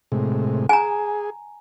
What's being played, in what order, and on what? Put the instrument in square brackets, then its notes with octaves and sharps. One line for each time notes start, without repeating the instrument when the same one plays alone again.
[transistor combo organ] A2 C3 G#3
[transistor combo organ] G#4 [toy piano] G#5 A#5